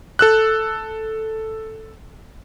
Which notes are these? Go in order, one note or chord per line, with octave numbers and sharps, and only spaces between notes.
A4 E6 F#6